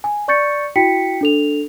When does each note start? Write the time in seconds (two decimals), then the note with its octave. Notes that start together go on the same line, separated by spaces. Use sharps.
0.04 G#5
0.28 D5 C#6 G6 A6 C#7
0.76 E4 F#4 G5 B6 C#7
1.21 D4 A4 F7